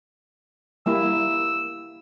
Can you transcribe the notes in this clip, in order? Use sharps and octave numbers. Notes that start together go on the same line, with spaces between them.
G3 A#3 E4 E6